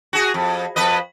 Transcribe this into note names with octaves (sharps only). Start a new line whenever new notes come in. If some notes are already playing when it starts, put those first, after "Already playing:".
F#4 G#4
F2
F2 B4 D#5